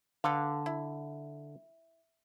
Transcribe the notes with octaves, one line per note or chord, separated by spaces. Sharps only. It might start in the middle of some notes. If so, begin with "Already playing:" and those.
D3 A4 B4 F5
E4